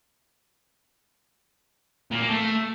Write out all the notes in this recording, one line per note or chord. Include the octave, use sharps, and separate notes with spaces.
A#2
A#3
A3